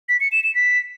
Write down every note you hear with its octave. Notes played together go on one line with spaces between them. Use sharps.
B6
C#7
E7
E7
B6